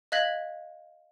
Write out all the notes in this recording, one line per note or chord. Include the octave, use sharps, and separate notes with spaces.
D#5 F5 F#6 G#6 B6 F#7